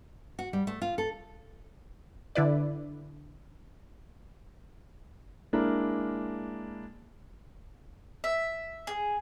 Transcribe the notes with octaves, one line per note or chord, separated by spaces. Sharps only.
F#4
G3
A3
F4
A4
D3 E4 B4 D5
G#3 A#3 D4 E4 A#4
E5
G#4